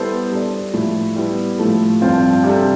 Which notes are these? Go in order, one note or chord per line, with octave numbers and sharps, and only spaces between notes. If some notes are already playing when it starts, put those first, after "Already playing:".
Already playing: G3 B3 E4 A4 C5
G3 D4 A4 D5
A2 F3 A3 E4 A4
G3 B3 E4
A2 F3 A3 E4 A4
G2 F3 C4 F4
C3 G3 D4 A4